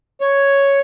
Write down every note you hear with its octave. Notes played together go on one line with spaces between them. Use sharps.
C#5